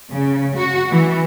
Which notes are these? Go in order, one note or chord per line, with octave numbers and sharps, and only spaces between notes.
C#3
F#4
E3